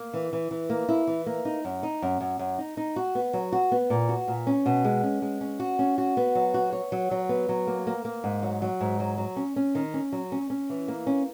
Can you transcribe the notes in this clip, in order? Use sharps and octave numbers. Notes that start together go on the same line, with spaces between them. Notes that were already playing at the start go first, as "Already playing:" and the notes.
Already playing: A#3
E3
E3
E3
A#3
E4
E3
A#3
D#4
F#2
D#4
F#2
F#2
F#2
D#4
D#4
F#4
B3
F#3
F#4
B3
A#2
F#4
A#2
C#4
B2
G#3
C#4
G#3
C#4
F#4
C#4
F#4
B3
F#3
F#4
C#5
F#3
F#3
B3
F#3
A#3
A#3
A#3
G#2
F#3
F#3
G#2
F#3
F#3
C#4
C#4
D#3
C#4
F#3
C#4
C#4
E3
A#3
C#4